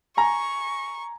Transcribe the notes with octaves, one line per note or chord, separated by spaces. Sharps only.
G#5 A#5 C#6